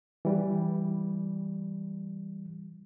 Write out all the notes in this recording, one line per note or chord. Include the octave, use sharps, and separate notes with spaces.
E3 G3